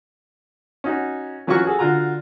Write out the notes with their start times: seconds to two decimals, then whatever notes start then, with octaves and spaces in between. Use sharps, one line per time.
0.84 C#4 D#4 F#4
1.47 E3 F#3 C#4 F4 F#4 C#6
1.65 F#4 G#4 A4
1.79 D3 F4 F#4 A#5